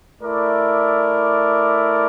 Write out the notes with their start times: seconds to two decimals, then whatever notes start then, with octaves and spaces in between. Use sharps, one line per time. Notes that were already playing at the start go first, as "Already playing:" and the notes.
0.20 A3 E4 A#4 D5